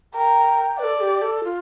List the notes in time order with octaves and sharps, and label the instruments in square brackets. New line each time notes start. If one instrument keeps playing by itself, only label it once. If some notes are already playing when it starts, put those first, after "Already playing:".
[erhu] A#4 [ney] G5
[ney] A4 B4 [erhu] D5
[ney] G4
A4
F4